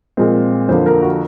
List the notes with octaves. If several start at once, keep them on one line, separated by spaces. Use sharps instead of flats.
A#2 F3 G#3 C4
F2 D3 F3 A#3 C5
A#4
F#4